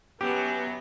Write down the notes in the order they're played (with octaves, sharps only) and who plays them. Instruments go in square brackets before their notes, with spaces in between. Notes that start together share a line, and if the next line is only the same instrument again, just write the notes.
[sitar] F#2 F#3 [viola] B3 [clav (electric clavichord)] G4